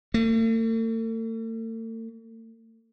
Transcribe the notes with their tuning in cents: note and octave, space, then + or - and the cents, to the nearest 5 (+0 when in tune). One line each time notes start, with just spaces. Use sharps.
A3 +45